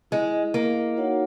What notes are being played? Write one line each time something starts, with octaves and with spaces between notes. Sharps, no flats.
G#3 E4 G#4 D#5
A#3
D#4 F#4 C#5 F#5